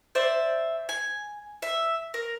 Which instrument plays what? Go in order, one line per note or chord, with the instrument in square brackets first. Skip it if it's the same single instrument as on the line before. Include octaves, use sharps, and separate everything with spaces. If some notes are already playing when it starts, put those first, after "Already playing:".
[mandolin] C5 D5 E5
G#5
E5
A#4